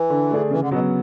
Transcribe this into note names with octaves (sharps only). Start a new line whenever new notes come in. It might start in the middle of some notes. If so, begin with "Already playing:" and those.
Already playing: E3
D3
A3 D4 G#4
C#3 E3
D3
B2 F#3 B3